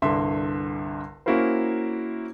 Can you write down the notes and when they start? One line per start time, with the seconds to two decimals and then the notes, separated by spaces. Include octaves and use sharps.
0.02 G1 C2 D3 E5 C6
1.26 A#3 C#4 E4 F#4 A#4 C5